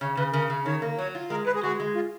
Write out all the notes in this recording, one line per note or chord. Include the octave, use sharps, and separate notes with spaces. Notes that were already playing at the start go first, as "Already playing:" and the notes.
C#3 C#5
C#3 B4
C#3 A#4
C#3
D#3 C#5
A#3
F#3 C#5
F4
G#3 A#4
G#3 B4
G#4
G#3 F#4
G#3
F4